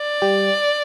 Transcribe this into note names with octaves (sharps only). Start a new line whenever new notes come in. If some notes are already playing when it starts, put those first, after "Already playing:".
Already playing: D5
G3 G4